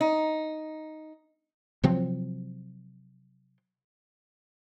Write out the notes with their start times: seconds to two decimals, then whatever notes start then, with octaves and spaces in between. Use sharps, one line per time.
0.01 D#4
1.84 C3 F3 F#3 C4